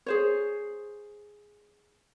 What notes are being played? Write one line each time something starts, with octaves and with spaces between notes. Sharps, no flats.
G#4 C5 C#5